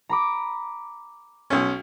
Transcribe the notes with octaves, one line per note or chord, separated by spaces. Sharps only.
A#5 B5 D6
B1 C#4